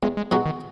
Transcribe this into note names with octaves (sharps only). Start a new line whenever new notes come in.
E2 G#3
G#3
B2 F#3 G#3 D#4 F#4
D#3